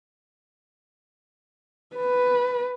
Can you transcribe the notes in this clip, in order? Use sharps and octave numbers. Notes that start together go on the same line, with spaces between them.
B4